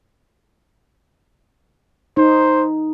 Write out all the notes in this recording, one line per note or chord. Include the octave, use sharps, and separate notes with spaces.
D#4 C5